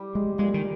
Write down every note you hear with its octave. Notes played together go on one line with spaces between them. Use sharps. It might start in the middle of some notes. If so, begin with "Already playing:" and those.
Already playing: G3
G#3
A#2 G#3
D#3